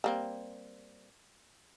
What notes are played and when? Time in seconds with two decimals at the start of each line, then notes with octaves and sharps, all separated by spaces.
0.04 G3 A#3 C4